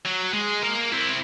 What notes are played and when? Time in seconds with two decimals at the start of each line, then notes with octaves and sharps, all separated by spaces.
0.05 F#3
0.33 G#3
0.63 A#3 A#4
0.92 C4 E4